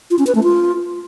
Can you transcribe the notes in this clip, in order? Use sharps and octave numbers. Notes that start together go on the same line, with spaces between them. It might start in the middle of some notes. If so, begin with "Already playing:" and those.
F4
C#4
B4
A3
F4